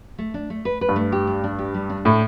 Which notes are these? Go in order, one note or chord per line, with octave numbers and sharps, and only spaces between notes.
A3
D4
A3
B4
B4
G2
A3
G4
D4
D4
G4
G3
D4
A2 A4